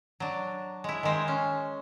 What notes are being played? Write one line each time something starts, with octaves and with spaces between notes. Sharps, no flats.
F#3 D4
G#3 E4
D#3 G#3 C5
C#4